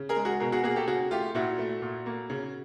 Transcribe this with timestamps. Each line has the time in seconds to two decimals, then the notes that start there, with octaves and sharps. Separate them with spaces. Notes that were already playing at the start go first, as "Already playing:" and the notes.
Already playing: C#3
0.09 G#4 A#4
0.16 G#3
0.25 F#4 G#4
0.40 B2 G#4 A#4
0.52 F#4 G#4
0.64 A#3 F#4 G#4
0.76 G4 A4
0.87 C#3 F#4 G#4
1.11 A3 F4 G4
1.35 A#2 E4 F#4
1.59 A3
1.82 A#2
2.06 A#3
2.30 C#3